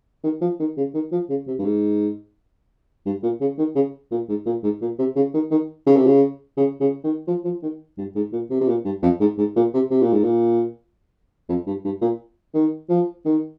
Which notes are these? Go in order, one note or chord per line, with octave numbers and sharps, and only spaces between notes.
D#3
F3
D#3
C#3
D#3
F3
C#3
C3
G2
G#2
G2
A#2
C#3
D#3
C#3
A#2
G#2
A#2
G#2
A#2
C3
C#3
D#3
D#3
C#3
C3
C#3
C#3
C#3
D#3
F3
F3
D#3
G2
G#2
A#2
C3
C3
A#2
G2
F2
G#2
G#2
A#2
C3
C3
A#2
G#2
A#2
F2
G2
G2
A#2
D#3
F3
D#3